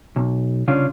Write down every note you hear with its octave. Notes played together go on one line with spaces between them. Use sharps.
B1
C2 C#3 C#4 D4 F4